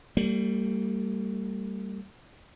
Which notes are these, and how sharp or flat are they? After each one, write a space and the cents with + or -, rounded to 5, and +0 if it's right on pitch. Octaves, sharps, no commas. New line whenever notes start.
G3 +0 A#3 -45